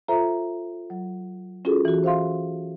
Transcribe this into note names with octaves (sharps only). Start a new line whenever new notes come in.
F4 A4 C5 E5 A#5
F#3
C#4 F4 F#4 G#4 A4
E3 F#4
C5 E5 F5 C6